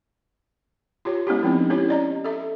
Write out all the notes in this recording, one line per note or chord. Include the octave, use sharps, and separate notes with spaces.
F4 G4 C#5
G#3 B3 C#4 E4 G4
F3 C4 C#4 D#4
C#4 E4 G4 C#5
D5 D#5 A#5
A4 E5